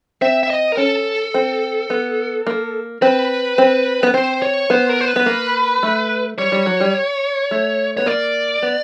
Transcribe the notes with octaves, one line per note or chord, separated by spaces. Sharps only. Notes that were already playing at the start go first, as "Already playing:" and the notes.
C4 E5
E5
D#5
A#4
C#4 A4
C4
B3
A#3
C4 B4
C4
B3
C4 C5
C#5
B3 C5
A#4
C5
B4
B3
A#3
A3
G3 C#5
G3
F#3
G3
A3
B3 C#5
A#3 D5
B3